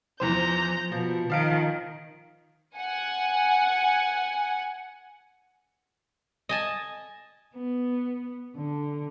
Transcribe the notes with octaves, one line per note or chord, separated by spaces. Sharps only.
E2 E3 F3 C5 A#5 G6
B2 F3
D#3 F3 F5 D7
F#5 G#5
D#5 G#5 A5
B3
D3